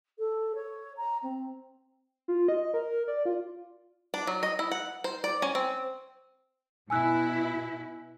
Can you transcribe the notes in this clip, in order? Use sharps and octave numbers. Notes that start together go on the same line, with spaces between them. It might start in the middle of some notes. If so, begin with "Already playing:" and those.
A4
C#5
A#5
C4
F4
D#5
A#4
D5
F4
D4
F#3
D#5
E4
F#5
C5
D5
C#4
C4
B2 E4 G#5 E6 F#6